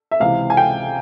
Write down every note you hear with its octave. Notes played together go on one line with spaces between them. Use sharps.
E5
C#2 C3 E3 F5
G#5
G5